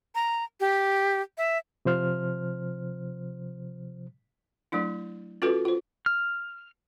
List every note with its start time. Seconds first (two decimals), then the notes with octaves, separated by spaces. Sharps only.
0.15 A#5
0.60 G4
1.38 E5
1.85 C3 F3 C5 F6
4.72 F#3 A3 D4 E4
5.42 C#4 F4 F#4 A4 B4
5.65 F4 C5
6.06 F6